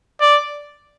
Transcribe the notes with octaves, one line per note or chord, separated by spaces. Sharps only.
D5